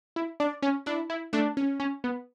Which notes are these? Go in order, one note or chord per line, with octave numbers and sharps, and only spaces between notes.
E4
D4 D5
C#4
D4 E4
E4
A3 D4
C#4
C#4
B3